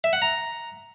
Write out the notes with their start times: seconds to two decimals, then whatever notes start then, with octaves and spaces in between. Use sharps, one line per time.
0.04 E5
0.13 F#5
0.22 A#5